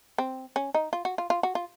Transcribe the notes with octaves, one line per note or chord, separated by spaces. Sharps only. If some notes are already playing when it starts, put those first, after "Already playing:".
C4
C#4
D#4
F4
F#4
F4
F4
F#4
F4